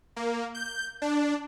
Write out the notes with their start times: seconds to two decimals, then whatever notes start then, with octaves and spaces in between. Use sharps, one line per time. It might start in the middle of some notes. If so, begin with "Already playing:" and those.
0.16 A#3
0.55 G6
1.02 D4